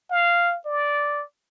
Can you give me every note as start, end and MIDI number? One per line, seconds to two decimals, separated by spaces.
0.11 0.57 77
0.66 1.23 74